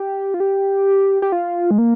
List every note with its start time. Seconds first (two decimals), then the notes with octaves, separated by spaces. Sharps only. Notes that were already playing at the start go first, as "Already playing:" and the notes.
Already playing: G4
0.34 F4
0.40 G4
1.22 G4
1.32 F4
1.71 G#3
1.78 A#3